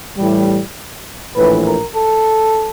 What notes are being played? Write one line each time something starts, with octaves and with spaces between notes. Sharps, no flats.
A2 E3 G3
A#1 A2 E3 B4
A#4
A4